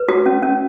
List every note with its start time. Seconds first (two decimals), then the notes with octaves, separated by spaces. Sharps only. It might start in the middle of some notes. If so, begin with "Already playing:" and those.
Already playing: B4
0.09 F#4
0.26 C#4
0.43 C#4